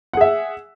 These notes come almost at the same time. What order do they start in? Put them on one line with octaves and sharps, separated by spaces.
F#5 G#4 E5